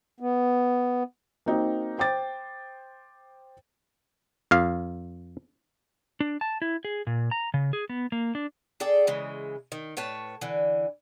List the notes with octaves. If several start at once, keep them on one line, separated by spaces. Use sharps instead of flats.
B3
A#3 C4 D#4 F#4
C5 G5 D6 A6
F2 F5
D4
A5
E4
G#4
A#2
A#5
C#3
G#4
B3
A#3
D4
G#4 A4 D5 G5
C#3 E3 G#3
D#3
A2 B4 C#5 A5
D3 E3